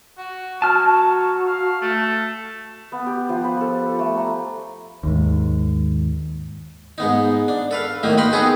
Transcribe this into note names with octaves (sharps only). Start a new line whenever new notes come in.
F#4
F#3 F#4 A5 F6
F5
A3
B3
G4
F3
B4
A4
A3
A#5
D#2 G#2
G#2 B3 D#4
D4
A4 B4 F5
A2 D#3 F#3 A#3 D#4
B4 D#5 F#5 G5 B5 C6
B3 D#4 F#4 G#4 A4 B4